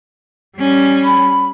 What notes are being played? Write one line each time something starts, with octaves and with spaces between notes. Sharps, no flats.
G3 C#4
B5